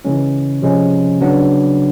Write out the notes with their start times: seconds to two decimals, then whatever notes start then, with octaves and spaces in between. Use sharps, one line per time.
0.05 C#3 E3 G#3 C#4
0.62 C3 F3 G#3 C#4
1.20 C#3 F#3 B3 D4